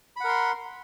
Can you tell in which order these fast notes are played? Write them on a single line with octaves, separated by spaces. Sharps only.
B5 F#5 A#4 C6